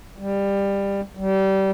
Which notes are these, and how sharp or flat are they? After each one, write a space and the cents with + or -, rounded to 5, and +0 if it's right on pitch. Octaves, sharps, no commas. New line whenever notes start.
G3 +15
G3 -25